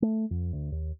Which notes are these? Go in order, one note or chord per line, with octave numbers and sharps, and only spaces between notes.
A3
F2
D2
D#2